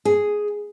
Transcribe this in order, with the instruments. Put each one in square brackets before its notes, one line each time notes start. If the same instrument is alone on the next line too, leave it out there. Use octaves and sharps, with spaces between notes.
[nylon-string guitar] G#4